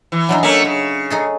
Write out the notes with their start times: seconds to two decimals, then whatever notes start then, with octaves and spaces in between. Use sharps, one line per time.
0.12 E3
0.29 F#3 D4 D#4
0.43 A3 A#3 C#4
0.65 C#3
1.10 D#4 G#4 A4